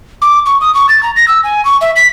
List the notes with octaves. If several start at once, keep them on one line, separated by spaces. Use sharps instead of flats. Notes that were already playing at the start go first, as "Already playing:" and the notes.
D6
C#6
D#6
C#6
A6
A#5
A#6
E6
G#5
C#6
E5
B6